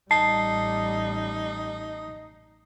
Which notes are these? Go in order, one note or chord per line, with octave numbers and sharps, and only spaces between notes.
A1 G3 D#4 A5 C7